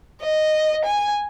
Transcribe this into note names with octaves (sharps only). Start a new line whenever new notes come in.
D#5
G#5